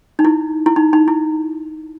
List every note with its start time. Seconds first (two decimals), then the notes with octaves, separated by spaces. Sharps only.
0.19 D#4
0.25 E4
0.66 E4
0.76 D#4
0.93 D#4
1.08 E4